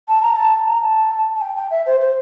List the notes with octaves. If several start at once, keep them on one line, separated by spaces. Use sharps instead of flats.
A5
A#5
A5
A#5
A5
A5
G5
G5
E5
C5
C5